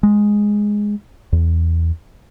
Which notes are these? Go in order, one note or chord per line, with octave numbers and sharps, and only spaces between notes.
G#3
E2